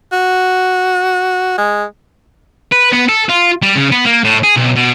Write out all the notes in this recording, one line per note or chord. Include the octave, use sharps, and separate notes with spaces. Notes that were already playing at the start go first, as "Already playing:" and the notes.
F#4
G#3
B4
B3
A4
F4
G3
C#3
B3
A#3
A2
G#4
B1
B2